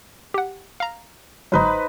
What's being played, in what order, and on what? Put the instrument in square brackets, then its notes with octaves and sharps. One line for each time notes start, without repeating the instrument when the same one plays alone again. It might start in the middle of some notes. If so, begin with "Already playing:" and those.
[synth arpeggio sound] G4 F#5
F5 A#5
[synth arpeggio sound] G1 G#2 F#3 [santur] D#4 B4 C5